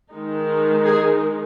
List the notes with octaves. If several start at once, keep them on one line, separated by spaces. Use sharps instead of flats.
D#3 G#3 D#4
G#4